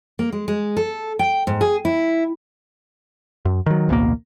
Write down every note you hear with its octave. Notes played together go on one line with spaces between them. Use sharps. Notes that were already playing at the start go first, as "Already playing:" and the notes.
A#3
G#3
G#3
A4
G5
G#2
G#4
E4
F#2
D#3 F#3
A1 D2 B2 A#3